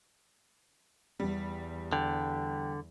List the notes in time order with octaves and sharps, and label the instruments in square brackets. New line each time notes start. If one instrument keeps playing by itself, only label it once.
[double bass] E2 [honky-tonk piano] G3
[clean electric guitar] D3 [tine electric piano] G5